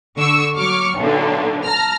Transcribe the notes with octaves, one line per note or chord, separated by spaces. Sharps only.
D3 C#6 E6
F#3 C#6 D6 F6
B1 A#2 D3
A5 A#5 F6